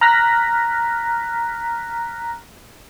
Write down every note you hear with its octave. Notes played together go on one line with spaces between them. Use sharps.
A#5 F6 F#6 A#6 B6